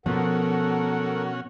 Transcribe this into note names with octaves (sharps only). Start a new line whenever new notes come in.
B2 F3 C#4 F#4 A4 A#4 F#5